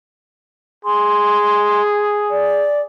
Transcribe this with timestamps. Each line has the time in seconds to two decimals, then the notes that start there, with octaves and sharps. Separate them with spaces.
0.85 G#4 C6
2.31 D5